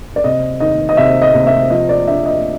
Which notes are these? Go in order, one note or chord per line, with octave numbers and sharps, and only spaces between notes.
D5
C3 D#5
D#3 D#5
D#5
C3 E5
D#5
C3
E5
F3 D#5
D5
D4 E5
D#5